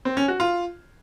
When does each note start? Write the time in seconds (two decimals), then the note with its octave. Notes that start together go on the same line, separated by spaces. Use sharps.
0.05 C4
0.17 C#4
0.28 F#4
0.40 F4